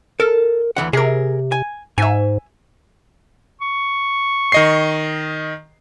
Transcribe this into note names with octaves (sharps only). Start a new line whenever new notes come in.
A4 A#4
D2 E3 F#5
C3 G#4 A#4
G#5
G#2 E5 G#5
C#6
D#3 D#5 C7